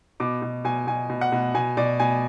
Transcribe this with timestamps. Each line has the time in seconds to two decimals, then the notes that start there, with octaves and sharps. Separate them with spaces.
0.20 B2 D6
0.42 B2
0.65 B2 G#5
0.87 B2 G#5
1.10 B2
1.21 F#5
1.32 B2
1.54 B2 G#5
1.77 B2 D5
2.00 B2 G#5